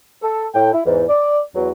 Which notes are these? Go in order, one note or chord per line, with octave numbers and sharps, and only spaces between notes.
A4
A2 G5
E4
E2 G#2
D5
E2 F#3